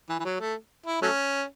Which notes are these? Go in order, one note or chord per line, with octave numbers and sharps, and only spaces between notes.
E3
E3
F#3
A3
E4
F#3 A3 C#4